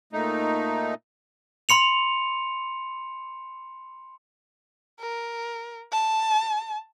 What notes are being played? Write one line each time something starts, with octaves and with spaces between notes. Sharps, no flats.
A#2 A3 D#4
B5 C6 C#7 F7
A#4
A5